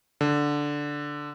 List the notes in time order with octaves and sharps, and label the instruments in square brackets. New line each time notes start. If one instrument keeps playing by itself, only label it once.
[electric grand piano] D3